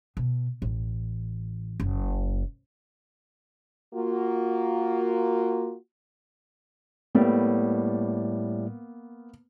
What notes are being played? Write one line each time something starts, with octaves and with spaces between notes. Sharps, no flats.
B2
A1
F#1
A#3 F4 F#4
A2 G3 A#3 B3